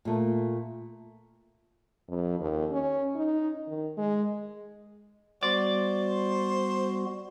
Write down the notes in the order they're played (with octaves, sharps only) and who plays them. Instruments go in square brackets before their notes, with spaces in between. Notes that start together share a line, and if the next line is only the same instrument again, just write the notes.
[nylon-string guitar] A#2 A3
[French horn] F2
D#2
C#4
D#4
D#3
G#3
[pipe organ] G3 B3 F#4 [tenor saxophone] C5 [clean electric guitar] D5